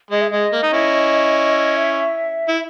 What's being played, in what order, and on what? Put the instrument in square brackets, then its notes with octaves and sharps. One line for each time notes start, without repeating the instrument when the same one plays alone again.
[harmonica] G#3 [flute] D#5
[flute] E5
[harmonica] G#3 [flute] D#5
[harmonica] A#3
D#4
C#4 E4
[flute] E5
[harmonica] E4